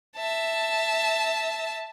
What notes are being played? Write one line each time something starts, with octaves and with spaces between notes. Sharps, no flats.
E5 A5